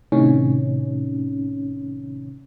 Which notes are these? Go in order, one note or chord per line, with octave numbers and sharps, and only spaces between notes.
A2 C3 D#3 C#4